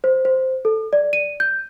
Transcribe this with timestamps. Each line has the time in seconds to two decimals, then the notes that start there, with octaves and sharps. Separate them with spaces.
0.04 C5
0.25 C5
0.65 A4
0.93 D5
1.13 D#7
1.40 G6